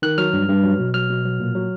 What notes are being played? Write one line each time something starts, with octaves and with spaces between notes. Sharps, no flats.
D#3 F#6
F#3 F6
G2
G2
F#3
B2
F#3 F6
B2
F#3
A#2
F#3